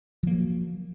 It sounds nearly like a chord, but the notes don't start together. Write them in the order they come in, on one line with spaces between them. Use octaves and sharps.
F3 A#3 F#3